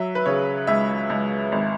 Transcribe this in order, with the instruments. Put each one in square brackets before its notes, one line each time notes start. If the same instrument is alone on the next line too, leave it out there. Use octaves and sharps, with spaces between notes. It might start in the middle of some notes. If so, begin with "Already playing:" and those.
Already playing: [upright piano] F#3 E5
B4
C#3 C#5
C#2 E5
C#2
G#1